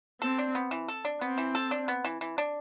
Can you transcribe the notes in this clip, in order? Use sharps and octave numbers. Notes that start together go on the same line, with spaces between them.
C4 A4
D4
B3
E3
A4
D4
B3 C4
E3
A4
D4
B3
E3
E3
D4